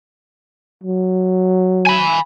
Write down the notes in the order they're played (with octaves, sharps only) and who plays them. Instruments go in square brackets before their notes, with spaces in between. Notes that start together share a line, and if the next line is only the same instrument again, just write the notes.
[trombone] F#3
[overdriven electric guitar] G#5 B5